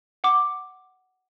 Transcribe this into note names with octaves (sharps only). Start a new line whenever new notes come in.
F#5 D6